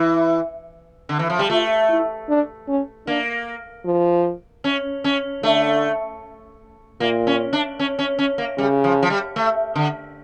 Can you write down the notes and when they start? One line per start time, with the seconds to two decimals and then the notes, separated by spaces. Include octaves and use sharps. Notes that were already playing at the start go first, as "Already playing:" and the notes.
Already playing: E3 E4
1.09 D3
1.19 E3
1.30 F3
1.39 G3
1.50 A3 F4
1.89 E4
2.29 D4
2.68 C#4
3.07 A#3 D4
3.85 F3
4.64 C#4
5.04 C#4
5.43 D3 A3
7.00 A#2 A#3
7.27 C#4
7.53 D4
7.79 C#4
7.99 C#4
8.19 C#4
8.38 A#3
8.58 C#3 G3
8.84 F3
9.03 F3
9.10 G3
9.36 A3
9.75 D3